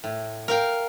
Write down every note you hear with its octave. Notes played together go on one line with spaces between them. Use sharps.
A2
A#4 F5 G5